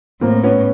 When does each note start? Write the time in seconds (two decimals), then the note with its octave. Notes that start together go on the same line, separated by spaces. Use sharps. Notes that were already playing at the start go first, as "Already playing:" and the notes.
0.21 A2 A#3 C4
0.43 B3 C#4